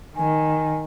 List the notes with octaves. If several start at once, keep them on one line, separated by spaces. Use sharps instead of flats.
D#3 G#5